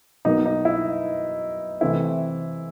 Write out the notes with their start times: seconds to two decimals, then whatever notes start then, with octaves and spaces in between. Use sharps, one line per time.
0.25 B2 F#3 A#3 D#4
0.46 D#4
0.65 E4
1.81 C3 E3 A3 C4 E4